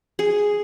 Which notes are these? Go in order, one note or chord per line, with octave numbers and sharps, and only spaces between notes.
G#4